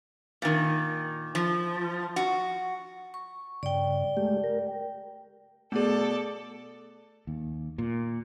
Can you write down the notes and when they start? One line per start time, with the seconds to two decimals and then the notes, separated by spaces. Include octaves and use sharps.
0.42 A#2 D#3
1.35 F3
2.16 F#4
3.14 C#6
3.63 G2 C#3 D5 G5
4.17 G#3 A3 G4
4.44 A#4
5.72 B2 A3 G#4 A4 D5
7.27 D#2
7.78 A#2